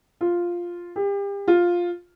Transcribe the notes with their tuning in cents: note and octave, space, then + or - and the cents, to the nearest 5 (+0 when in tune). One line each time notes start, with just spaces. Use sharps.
F4 +0
G4 +35
F4 +5